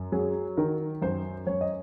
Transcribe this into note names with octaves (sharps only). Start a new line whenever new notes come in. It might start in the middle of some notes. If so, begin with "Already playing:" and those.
Already playing: F#2
F#3 G#4
D#3 A#4
F#2 C5
F#2 C#5
D#5